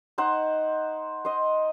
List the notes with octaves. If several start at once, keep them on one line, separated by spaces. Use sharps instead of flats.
D#4 C5 F#5
C5 D#5